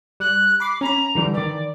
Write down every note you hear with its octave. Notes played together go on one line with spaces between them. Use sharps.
G3 F#6
B5 D6 C7
C#4 A#5 B5
D3 E3 G3
D#3 E3 D5